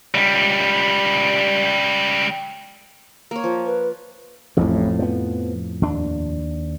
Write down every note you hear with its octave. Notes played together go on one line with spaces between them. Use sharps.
C#2 G3
A#3 C#5
F3
B4
A1 F2 A2
F3 B3
D#2 D4